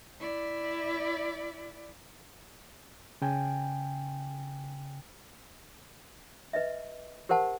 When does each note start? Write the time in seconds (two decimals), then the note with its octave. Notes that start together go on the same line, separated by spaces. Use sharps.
0.20 E4 D5
3.22 C#3 G5 G#5
6.53 B4 D#5 E5
7.29 G4 A#4 C5 F#5 A5